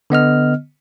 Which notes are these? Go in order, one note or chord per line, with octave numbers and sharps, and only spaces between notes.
D3 B3 D#5 F6